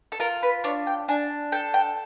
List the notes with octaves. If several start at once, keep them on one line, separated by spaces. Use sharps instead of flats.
A4
F4 A#4
B4
D4 C#5
G5
D4 G#5
A4 G5
G5